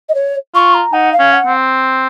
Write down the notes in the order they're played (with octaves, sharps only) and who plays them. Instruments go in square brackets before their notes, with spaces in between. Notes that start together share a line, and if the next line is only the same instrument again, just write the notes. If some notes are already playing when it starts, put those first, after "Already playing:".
[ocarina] D#5
C#5
[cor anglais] F4 [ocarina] C#6
[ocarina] A#5
[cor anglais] D#4 [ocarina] F#5
[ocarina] F5
[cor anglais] C#4
[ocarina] F#5
[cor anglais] C4